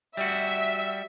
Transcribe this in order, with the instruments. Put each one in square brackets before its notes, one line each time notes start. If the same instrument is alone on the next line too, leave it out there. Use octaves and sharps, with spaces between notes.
[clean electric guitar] G3 F#4 [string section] E5